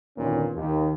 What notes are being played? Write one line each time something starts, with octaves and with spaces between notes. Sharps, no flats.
G#1 D#2 A#2 D3 B3 C#4
D#2